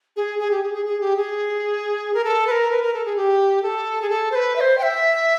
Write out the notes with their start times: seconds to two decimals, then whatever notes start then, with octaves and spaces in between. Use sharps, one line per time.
0.16 G#4
0.39 G#4
0.51 G4
0.62 G#4
0.73 G#4
0.85 G#4
1.00 G4
1.16 G#4
2.14 A#4
2.24 A4
2.47 B4
2.51 A#4
2.71 B4
2.82 A#4
2.93 A4
3.05 G#4
3.16 G4
3.62 A4
4.02 G#4
4.09 A4
4.31 C5
4.35 B4
4.55 E5
4.60 C5
4.78 G5
4.82 E5